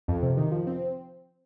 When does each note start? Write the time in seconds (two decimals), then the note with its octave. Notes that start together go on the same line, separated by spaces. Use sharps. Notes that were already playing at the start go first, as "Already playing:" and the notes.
0.08 F2
0.23 C3
0.37 D#3
0.52 F3
0.67 C4